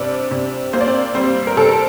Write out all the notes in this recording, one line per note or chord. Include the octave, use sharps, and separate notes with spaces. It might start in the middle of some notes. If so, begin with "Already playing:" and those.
Already playing: C3 G3 D4 D5
C3
A#3 C5
D5
C4 C5
G3 C4 C5
A#4
C3 A4
A#4